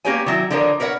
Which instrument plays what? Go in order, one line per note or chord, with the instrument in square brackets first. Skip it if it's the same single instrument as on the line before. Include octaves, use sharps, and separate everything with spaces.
[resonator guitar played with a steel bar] A#3 C#4 G4 B4 C#5 G#5
D#3 F#3 E4
D3 D#3 F3 D4 A#4 C#5
A#4 B4 C#5 D5 F#5